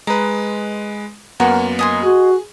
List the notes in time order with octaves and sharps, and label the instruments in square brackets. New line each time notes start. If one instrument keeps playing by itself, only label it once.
[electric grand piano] G#3 B4 [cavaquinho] A#5
[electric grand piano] F#2 A#3 B3 [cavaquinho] F#4 A#4 G#5
[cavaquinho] D#5 G#5 C6
[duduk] F#4 [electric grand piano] G#4